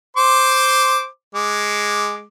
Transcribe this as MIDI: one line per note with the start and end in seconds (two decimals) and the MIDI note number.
0.17 1.06 72
0.17 1.06 84
0.17 1.06 86
1.35 2.23 56
1.35 2.23 86